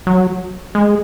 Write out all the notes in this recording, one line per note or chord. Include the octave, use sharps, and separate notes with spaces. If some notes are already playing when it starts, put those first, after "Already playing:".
F#3
G#3